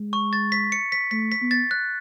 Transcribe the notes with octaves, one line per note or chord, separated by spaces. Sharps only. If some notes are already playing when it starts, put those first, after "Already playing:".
Already playing: G#3
C#6
A6
B6
C#7
B6
A3 B6
B6
B3
A6
F#6